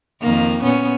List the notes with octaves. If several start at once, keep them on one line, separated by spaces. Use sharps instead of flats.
F2 D#3 A#3
A#2 B3 C#4